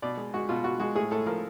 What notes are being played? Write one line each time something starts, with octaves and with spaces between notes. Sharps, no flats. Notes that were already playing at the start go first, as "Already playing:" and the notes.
B2 D5
G#3
G#3 F#4
B2 F4
B2 F#4
G#3 F#4
A2 G#4
A2 A4
F3 A#4